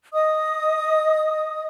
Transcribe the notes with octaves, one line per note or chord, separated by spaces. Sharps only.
D#5 D#6